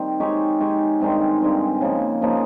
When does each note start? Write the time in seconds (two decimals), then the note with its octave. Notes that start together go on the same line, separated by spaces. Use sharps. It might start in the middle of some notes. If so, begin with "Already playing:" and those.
Already playing: D#3 G3 C4
0.20 G#3 D#4 G4 C#5
0.60 G#3 D#4 G4 C#5
1.01 G2 D#3 G#3 C4
1.41 G2 D#3 G#3 C4
1.81 C#3 F3 A#3 D#4
2.22 C#3 F3 A#3 D#4